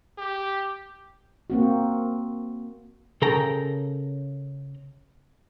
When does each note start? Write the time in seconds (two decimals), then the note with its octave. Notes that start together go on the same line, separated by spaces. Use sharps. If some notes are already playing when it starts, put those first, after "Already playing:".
0.18 G4
1.50 A#3 C4 F#4
3.22 C#3 A4 A#4 G5 A#5